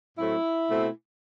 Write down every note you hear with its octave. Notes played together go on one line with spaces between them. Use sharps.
A2 F#3 A3 C4 E4
B2 A3 C4